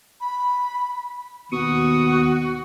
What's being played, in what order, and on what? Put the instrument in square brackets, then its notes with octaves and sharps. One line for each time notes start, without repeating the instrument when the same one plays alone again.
[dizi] B5
[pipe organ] D#2 C#6 D#6 [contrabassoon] B2 [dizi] F#4